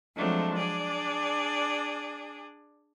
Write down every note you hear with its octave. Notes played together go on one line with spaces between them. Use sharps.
F3 F#3 G#3 A3 C4 D4
D4 G#4 D5